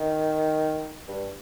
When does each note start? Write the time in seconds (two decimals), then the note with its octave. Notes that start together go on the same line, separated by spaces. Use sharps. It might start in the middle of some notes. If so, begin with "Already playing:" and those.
Already playing: D#3
1.08 G2